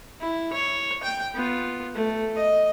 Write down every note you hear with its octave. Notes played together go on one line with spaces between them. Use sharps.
E4
C#5
G5
B3 F4
A3
D#5